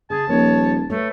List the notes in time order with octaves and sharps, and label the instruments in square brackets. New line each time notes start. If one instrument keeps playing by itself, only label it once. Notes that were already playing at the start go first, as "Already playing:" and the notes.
[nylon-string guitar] C#3 [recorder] G#4 [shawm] A5
[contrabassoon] D#1 [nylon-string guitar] F3 A#3 [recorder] C#5
[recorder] A3 [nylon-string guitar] B4 C#5